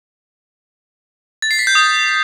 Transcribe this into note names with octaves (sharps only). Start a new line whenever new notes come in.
A6
C7
B6
G6
D#6